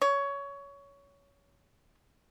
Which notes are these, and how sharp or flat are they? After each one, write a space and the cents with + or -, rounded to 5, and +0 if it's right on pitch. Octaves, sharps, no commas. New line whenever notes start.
C#5 +20